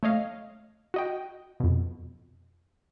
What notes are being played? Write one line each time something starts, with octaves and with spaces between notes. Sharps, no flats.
A3 C#5 D#5 F5
F#4 D#5 G5
F2 B2